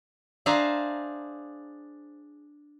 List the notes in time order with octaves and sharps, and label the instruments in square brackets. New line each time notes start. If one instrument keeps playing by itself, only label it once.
[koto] D4 G#4 C5 E5 F5 A#5